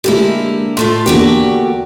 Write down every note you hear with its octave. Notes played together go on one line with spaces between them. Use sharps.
D3 G#3 A#3 E4 G4
A2 A3 F4 C6
E2 D3 A3 A#3 F#4 G4